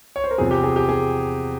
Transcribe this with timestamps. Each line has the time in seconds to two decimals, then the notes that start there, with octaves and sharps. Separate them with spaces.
0.16 C#5
0.24 C5
0.31 A#4
0.38 E2 C3 F3 G#4
0.51 G4
0.63 G#4
0.76 G4
0.89 G#4